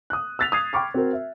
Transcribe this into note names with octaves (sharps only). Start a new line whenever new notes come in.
D#6 F#6
E6 F#6 A6 B6 F7
D#6 G#6 C7
G5 B5 C#6 D6 F6
C4 F#4 A#4
E5